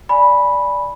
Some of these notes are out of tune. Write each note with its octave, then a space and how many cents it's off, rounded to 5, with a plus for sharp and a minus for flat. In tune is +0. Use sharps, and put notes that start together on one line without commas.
D5 -5 G#5 +0 B5 -10